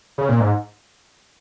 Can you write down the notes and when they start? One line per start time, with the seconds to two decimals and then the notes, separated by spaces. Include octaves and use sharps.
0.18 C#3
0.29 A#2
0.40 G#2